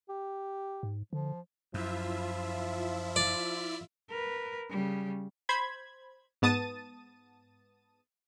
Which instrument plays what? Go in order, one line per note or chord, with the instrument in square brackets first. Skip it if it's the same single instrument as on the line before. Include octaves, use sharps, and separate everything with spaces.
[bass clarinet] G4
[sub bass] G#2
[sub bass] D3 [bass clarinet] F3
[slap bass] F#2 [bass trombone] F3 [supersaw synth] E4 F4 E5
[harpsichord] D5
[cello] A#4 B4
C#3 G3
[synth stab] C5 B5 G#6
G#2 B3 A5 D#6 A6 D#7